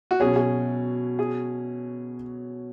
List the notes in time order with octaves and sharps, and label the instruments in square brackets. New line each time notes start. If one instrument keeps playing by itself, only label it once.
[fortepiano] F#4
[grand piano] B2 F#3 C#4 [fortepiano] G#4
[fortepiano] G#4
G#4